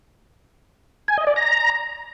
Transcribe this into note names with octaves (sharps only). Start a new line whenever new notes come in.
G#5
D#5
D5
A#5